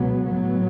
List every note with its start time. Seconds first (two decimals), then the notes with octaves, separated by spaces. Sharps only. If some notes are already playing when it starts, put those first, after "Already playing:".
Already playing: C#2 B2 F#3 B3
0.29 A2 F#3 B3